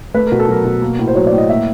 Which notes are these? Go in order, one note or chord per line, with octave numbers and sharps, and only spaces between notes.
A3 B4
B2 A#4
A4
F#3 A#4
B2
A#3
A2
C5
F#3 C#5
D5
A2
D#5
A#3 E5